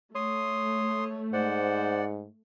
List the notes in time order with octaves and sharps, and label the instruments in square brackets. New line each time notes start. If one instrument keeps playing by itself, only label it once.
[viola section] A3 [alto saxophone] C#5 [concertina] C6 D#6
[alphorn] G#2 [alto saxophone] C5 [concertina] D5 F#5